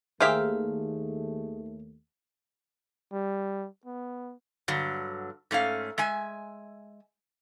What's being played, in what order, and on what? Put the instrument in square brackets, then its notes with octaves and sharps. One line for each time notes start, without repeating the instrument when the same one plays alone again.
[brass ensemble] D#2 A3 [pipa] G4 A#4 F5 [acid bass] G#4 [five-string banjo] C5 E5
[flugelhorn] G3
B3
[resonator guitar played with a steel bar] G2 D3 F#3
G#2 A3 C#4 F5
G#3 E5 G#5